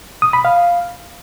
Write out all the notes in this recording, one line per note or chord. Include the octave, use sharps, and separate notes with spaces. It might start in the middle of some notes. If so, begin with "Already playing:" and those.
D#6
B5
F5